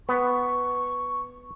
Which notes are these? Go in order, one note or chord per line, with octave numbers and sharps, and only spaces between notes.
B3 C#6